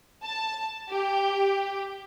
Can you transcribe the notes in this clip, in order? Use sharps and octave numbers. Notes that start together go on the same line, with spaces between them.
A5
G4